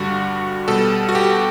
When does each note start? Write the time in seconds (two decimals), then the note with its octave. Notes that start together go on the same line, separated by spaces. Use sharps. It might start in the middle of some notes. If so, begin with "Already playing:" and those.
Already playing: G2 D3 G3 F#4
0.68 B2 G3 A4
1.09 F#4
1.15 G4